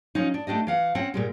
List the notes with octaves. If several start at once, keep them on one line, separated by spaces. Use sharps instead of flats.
F3 C#4 D#4
D4
A3 D4 G4 D#5
E3 F5 F#5
C4 C#4 F#5
A#2 G3 G#3